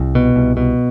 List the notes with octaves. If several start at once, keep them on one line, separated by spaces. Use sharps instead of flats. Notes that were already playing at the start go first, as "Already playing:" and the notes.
Already playing: C2
B2
C2
B2